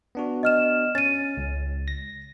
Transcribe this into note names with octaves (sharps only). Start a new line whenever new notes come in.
B3 D4 F#4
D#5 F6 E7
C#4 A6 D#7
C#2
A#6